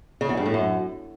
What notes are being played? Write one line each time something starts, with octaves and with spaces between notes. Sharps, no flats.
C#3
E2
G2
A2
F#2